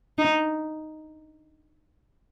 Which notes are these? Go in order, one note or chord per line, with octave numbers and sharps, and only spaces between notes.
D#4